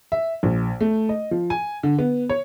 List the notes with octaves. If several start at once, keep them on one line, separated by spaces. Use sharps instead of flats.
E5
A#1
A3
D#5
F3
G#5
D3
B3
C#5